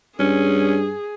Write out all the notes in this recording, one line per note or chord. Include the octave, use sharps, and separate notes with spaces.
G2 C#4 G#4